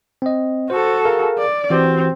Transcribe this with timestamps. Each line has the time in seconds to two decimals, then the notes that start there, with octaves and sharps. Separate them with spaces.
0.22 C4 D#5
0.70 F#4 A4 C5
1.05 G#4 A#4 F5
1.38 D5
1.70 E3 C4 F#4 G4